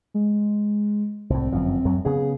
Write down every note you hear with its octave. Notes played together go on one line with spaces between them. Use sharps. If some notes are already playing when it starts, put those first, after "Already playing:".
G#3
C2 A2 C4
G1 F#2 F3
F#2 F#3
C#3 B3 G#4